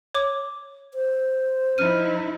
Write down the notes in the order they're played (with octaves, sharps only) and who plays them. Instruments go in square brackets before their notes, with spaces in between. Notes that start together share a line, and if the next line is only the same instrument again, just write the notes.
[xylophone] C#5 D6
[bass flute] C5
[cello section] F3 D#4 E4 [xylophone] F6 D#7